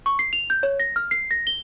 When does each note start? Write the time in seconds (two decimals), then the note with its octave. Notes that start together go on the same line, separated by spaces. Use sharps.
0.06 C#6
0.19 C7
0.33 F7
0.50 G6
0.63 C#5
0.80 A#6
0.96 F6
1.11 C7
1.31 A#6
1.47 G7